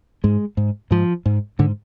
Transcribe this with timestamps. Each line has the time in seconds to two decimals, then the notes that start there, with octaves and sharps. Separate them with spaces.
0.24 G#2 G#3
0.57 G#2
0.91 G#2 F3
1.26 G#2
1.59 G#2 D3